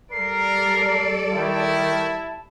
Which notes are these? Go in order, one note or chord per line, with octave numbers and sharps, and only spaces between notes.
G3 A4 A#4 D5 C7
D#3 E4 A5